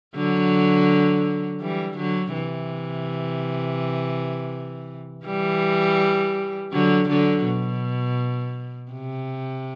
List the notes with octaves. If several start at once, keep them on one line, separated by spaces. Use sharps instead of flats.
D3 F#3
E3 G3
D3 F#3
C3 E3
E3 G3
D3 F#3
D3 F#3
B2
C3